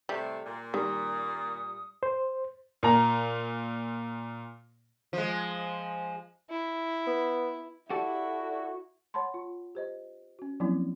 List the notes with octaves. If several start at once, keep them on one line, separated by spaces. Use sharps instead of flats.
A2 C3 G3 A3
A#2
D#3 G3 D#6
C5
A#2 A#5
F3 G#3
E4
B3
E4 F#4 G4 A4 D5
C#5 F#5 A5 B5 C6
F4
G4 C5 D#5
C#4 F#4
F3 F#3 A#3 C4 C#4 E4